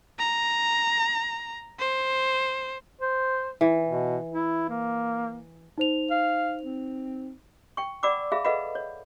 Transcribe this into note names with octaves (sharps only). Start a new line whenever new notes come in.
A#5
C5
C5
E3
B2
E4
A#3
D#4 C5 F7
F5
C4
G5 C#6
D5 F#5 B5 D6 E6
G#4 E5 F5 B5
A4 B4 D#5 F5 F#5 B5
C#5